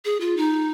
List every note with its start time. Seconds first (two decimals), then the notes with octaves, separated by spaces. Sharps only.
0.05 G#4
0.20 F4
0.37 D#4